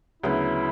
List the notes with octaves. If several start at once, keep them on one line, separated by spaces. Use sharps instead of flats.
D2 C#3 F#3 B3 E4